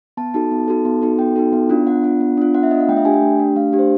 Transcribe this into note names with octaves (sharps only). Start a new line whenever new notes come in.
B3 A5
D#4 F#4 A4 A5
B3
D#4 F#4 A4
B3
D#4 F#4 A4
B3 G5
D#4 F#4 A4
B3
D4 F4
B3 F#5
D4 F4
B3
D4 F4
B3 F#5
E5
D4 F4 D#5
F5
A3 G5
E5
D4 G4 G#5
G5
A3
D4 G4
A3 F5
D4 G4
C5